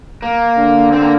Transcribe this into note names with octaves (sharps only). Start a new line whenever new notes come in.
A#3
D3
C4
A#3